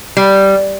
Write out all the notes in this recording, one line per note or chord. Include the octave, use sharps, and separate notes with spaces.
G3